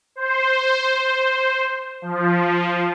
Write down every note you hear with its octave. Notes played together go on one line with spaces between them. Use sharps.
C5
F3